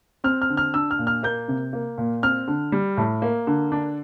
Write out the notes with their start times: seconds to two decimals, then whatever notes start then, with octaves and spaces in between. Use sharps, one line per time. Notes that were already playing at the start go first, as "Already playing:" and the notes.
0.24 C4 F6
0.42 F6
0.50 D3
0.57 F6
0.74 D4 E6
0.91 F6
0.99 A#2
1.07 F6
1.23 A#3 G6
1.48 C3
1.73 A#3
1.98 A#2
2.23 C4 F6
2.48 D3
2.72 G3
2.97 A2
3.22 A#3
3.47 D3
3.72 D4